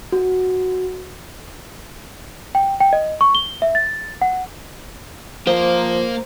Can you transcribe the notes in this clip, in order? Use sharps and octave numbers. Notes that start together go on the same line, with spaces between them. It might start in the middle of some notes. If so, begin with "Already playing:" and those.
F#4
G5
G5
D#5
C#6
G7
E5
A6
F#5
F3 A#3 A#4 C5